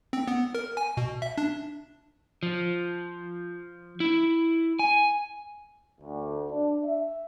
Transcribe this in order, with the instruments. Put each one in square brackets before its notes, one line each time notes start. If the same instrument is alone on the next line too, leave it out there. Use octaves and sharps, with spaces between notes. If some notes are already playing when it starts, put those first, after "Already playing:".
[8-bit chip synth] C4
B3
A#4
G#5
B2
E5
D4
[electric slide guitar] F3
E4
G#5
[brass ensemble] D2
D4
E5